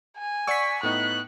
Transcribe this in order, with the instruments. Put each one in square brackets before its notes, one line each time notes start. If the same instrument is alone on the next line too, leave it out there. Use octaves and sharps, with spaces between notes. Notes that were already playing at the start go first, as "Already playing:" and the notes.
[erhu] G#5
[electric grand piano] D5 F#5 E6 [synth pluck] C#6 B6
[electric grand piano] A2 B3 D#4 [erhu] F#6